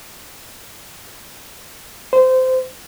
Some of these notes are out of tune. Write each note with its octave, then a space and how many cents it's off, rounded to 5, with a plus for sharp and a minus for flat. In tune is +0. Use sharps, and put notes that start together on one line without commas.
C5 -20